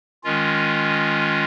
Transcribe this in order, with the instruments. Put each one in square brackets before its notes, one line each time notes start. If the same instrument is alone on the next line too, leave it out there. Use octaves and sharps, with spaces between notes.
[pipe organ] D#3 G#3 C#4 F4